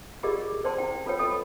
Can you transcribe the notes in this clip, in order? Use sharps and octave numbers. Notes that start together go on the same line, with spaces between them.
F4 G4 G#4 A#4 D5 D#5
A#4 C5 D5 G5 A5 C6
E4 G5
F4 A4 B4 C#5 G5
F4 A4 D#5 B5 D#6